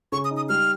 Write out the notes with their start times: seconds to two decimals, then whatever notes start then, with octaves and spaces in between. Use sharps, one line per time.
0.12 C#3 C#6
0.25 D#6
0.31 D#4
0.37 D#6
0.49 G3 F6